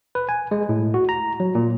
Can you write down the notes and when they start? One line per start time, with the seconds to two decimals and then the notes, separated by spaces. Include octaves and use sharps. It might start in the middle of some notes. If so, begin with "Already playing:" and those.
0.15 B4
0.29 G#5
0.51 G#3
0.69 A2
0.94 F#4
1.09 A#5
1.40 F#3
1.55 A#2